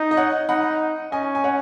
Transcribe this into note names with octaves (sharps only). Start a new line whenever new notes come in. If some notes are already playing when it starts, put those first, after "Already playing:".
Already playing: D#4
D#5
C#5 F#5
D#4 F#5 B5
C#4 D#5 G#5
G#5
C#5 F#5